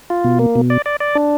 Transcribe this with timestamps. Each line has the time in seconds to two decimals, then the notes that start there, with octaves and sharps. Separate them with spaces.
0.10 F4
0.24 B2
0.39 A#3
0.55 B2
0.70 D5
0.86 D5
1.00 D5
1.15 D4